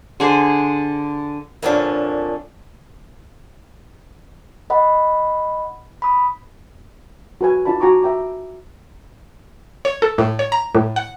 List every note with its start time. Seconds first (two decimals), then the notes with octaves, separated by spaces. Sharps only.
0.20 D3 G#4 C5
1.62 F2 A#2 D3 F3 C#4 D4
4.70 D#5 F#5 B5
6.02 B5 D#6
7.41 F#4 B4 G#5
7.65 D#4 F4 D5 A5 B5
7.80 F#4 G#5 A#5 C#6 D6
8.02 E5 G5 A#5 D6
9.85 C#5
10.02 A4
10.18 A2
10.39 C#5
10.52 A#5
10.75 A2
10.96 F#5